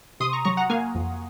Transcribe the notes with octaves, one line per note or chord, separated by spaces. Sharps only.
C3 C6 D#6
A#5 C#6
F#3 A#5 C#6
F#5 A#5
A#3 F5 G#5
F2